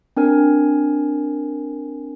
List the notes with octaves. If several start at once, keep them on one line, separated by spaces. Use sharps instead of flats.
C4 D4 A#4 G#5